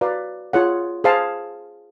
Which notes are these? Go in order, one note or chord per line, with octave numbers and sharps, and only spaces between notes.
F#4 B4 D5 F5 A#5
F4 G#4 C#5 F#5
G#4 C5 F5 A5